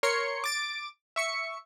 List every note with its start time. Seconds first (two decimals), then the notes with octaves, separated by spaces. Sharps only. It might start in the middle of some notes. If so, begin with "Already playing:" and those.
0.03 A#4 C#5 C6 C#7
0.44 D6 A6 D7
1.16 E5 C#6 C#7